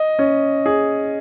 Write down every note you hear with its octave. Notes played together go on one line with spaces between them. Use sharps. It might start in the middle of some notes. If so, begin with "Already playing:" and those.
Already playing: D#5
C#4
G#4